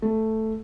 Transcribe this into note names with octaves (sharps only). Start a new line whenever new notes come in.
A3